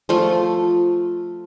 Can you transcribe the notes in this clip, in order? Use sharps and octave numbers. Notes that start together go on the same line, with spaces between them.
F3 A3 F4